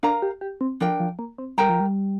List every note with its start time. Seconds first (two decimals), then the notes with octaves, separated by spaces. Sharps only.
0.03 D4 A#4 F5 A#5
0.22 G4
0.41 G4
0.61 C4
0.80 F3 D4 A#4 G5
1.00 F3
1.19 A#3
1.38 C4
1.58 G3 A#4 G5 A#5
1.69 F3
1.80 G3